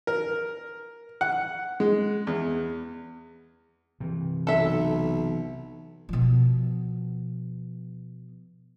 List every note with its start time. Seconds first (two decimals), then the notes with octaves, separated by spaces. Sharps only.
0.07 A#4
1.21 F#5
1.80 G#3
2.27 E2
4.00 C3 E3
4.47 B1 A4 E5
6.09 B2 F3